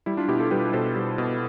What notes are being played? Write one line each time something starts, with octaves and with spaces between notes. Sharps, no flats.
G3 E4
D4 F4
B2 E4 G4
F4 A4
G3 G4 B4
B2 A4 C5
G3
B2